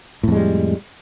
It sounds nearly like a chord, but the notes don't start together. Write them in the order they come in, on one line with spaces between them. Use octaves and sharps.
A2 F2 G#3 G3